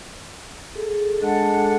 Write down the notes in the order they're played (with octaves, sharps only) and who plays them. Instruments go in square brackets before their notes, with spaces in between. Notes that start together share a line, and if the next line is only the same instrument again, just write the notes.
[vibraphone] G#4 A4
[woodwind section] G#3 D4 F#5 [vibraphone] A4